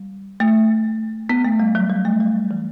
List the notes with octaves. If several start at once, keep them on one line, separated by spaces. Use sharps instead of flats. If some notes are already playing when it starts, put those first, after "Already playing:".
Already playing: G3
A3
B3
A3
G3
F#3
G3
A3
G3
E3